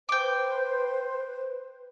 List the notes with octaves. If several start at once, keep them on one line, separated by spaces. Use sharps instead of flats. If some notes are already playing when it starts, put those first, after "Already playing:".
B4 C5 G5 D6